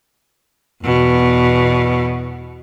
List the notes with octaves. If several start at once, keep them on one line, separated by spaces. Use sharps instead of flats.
E2 B2